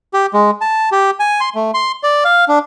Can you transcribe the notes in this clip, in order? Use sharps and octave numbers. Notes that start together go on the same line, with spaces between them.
G4
G#3
A5
G4
G#5
C6
A3
C6
D5
F5
D4